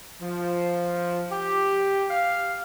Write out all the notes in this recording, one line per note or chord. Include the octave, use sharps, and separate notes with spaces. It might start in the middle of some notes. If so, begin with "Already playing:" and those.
F3
G4
F5